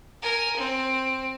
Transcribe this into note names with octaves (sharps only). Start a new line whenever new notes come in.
A#4 G#5
C4